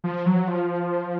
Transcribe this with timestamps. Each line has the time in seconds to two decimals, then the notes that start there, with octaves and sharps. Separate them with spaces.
0.04 F3
0.26 F#3
0.48 F3